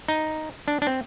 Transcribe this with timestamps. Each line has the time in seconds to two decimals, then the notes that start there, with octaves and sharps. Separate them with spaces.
0.08 D#4
0.68 D4
0.82 D4
0.87 C4